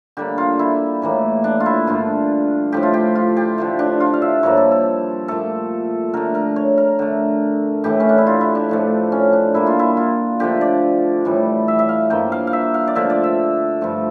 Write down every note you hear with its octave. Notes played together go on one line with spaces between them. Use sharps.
D3 G3 A#3 G4
F4
E4
A2 E3 A#3
D4
F4
E4
G2 D3 A3 F4
A2 F3 A3 G4
F4
G4
F4
G4
D3 F3 A3
D4
F4
F5
E5
G2 F3 A#3 C#5
A4
A4
A#2 A3 A4
D3 A3 A#4
A#4
C#5
A#4
D3 A3
A2 E3 A3 G4
C#4
D4
E4
F4
E4
D4
A2 F3 A3
C#4
D4
A#2 G3 A#3 E4
F4
E4
F4
D3 F3 A3 G4
D5
A2 E3 G3
E5
E5
F5
G2 F3 A#3 G5
F5
F5
E5
F5
D5
D3 F3 A3 E5
D5
E5
G2 F3 A3